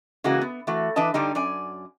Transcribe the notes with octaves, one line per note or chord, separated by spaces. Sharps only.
C#3 E3 G#3 A#3 F#4
B3
E3 A3 F#4
E3 D4 B4 D#5 A5
G2 D3 G3 D#4
F#2 D5 G#5